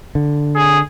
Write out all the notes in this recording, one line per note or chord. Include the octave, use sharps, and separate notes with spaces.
D3
G#4